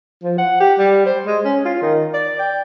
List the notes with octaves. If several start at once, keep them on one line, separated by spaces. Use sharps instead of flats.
F3
F#5
G4
G3
C5
G#3
C#4
F4
D#3
D5
G5